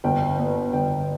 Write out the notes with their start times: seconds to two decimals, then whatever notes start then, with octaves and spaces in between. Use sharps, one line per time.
0.04 G1 G5
0.39 B3
0.73 G1 G5